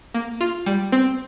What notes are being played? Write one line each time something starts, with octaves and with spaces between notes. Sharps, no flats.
A#3
F4
G3
C4